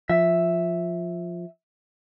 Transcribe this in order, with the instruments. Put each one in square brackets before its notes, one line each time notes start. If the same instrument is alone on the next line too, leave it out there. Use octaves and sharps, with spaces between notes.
[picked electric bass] F3 [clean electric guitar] E5